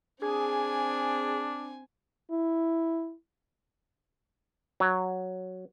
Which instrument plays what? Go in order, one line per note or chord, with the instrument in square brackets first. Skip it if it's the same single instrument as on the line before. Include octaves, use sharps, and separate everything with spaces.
[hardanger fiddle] C4 G#5 [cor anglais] D4 [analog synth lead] G#4
[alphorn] E4
[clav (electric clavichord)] F#3